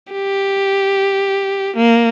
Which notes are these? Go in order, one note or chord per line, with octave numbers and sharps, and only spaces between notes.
G4
A#3